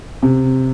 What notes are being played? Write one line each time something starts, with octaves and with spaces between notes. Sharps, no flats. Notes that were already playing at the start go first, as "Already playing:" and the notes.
C3